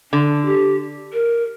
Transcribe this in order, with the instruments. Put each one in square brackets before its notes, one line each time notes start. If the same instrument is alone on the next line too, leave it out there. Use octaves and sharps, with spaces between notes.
[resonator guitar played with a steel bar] D3 [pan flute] D4
[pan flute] G4
A#4